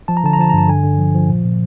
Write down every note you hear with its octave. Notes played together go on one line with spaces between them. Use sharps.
F3 A5
A#5
D3 A5
A#5
F3 A5
A#5
G2 A5
D3 G#5
D3
F3
F3
A#2
A#2